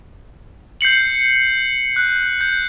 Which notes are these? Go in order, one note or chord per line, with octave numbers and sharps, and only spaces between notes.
G6 C7 C#7 F#7
F#6
G6